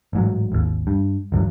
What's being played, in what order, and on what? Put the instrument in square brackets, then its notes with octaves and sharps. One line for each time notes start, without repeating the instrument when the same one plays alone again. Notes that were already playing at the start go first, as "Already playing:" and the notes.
[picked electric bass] A1 G#2 F#3
G#1 D#2
G2
G1 E2 G2 F#3